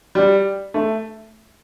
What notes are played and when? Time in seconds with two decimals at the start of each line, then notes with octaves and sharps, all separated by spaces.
0.15 G3
0.74 A3